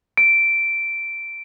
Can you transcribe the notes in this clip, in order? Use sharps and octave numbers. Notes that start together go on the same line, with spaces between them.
D7